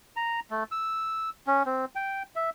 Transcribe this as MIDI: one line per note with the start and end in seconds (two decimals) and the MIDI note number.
0.16 0.40 82
0.51 0.63 57
0.71 1.30 88
1.47 1.63 61
1.66 1.85 60
1.96 2.23 79
2.36 2.50 76